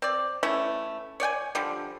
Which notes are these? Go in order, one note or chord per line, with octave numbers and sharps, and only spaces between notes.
C4 D5
E3 A3 C#4 E4
C#5 D5 G5 G#5
D3 F3 G3